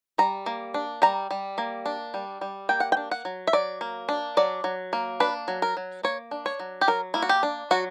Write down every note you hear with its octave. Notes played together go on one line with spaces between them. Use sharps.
G3 A#5
A#3
D4
G3 A#5
G3
A#3
D4
G3
G3
A#3 G5
F#5
G5
D4
F#5
F#3
E5
F#3 D5
A#3
D4
F#3 D5
F#3
A#3
D4 B4
F#3
A#4
F#3
A#3 C#5
D4
C#5
F#3
G4
F#3 A#4
A#3 E4
F#4
G4
D4
F#3 F#4